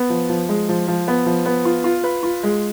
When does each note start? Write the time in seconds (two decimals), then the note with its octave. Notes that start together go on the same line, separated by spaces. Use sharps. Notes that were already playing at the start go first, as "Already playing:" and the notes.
Already playing: B3
0.10 F3
0.29 F3
0.49 G#3
0.69 F3
0.88 F3
1.08 B3
1.26 F3
1.46 B3
1.65 F4
1.84 F4
2.04 B4
2.23 F4
2.43 G#3